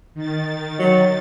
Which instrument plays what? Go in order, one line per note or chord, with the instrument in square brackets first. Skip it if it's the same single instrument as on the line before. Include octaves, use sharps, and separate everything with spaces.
[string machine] D#3 A6
[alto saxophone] F#3